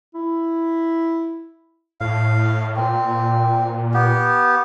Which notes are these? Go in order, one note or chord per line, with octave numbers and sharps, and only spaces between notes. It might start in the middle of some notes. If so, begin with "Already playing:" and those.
E4
A2 F5
A#2 C4
B3 G4